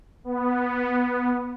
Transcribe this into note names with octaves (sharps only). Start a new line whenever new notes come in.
B3